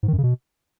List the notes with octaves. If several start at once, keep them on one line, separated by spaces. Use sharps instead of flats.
G#2
D#3
F#2
C#3
B2